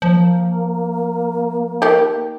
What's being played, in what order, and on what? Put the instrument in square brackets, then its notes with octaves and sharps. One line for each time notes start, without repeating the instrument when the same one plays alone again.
[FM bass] F3 [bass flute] A#3
[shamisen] D#3 G4